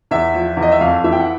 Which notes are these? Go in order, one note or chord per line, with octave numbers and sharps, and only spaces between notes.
E2 E5
F3
E2
D#5
E5
F2 F5
E3 E5
G5
F#5